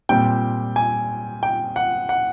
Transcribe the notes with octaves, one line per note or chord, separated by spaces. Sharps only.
A#2 G3 C4 G5
G#5
G5
F#5
F#5